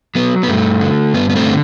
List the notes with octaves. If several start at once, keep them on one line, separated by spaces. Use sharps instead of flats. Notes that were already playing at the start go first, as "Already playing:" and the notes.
F#3 B3
B3
G2 A3
D3
G2 B3
B3
A3 C4
D3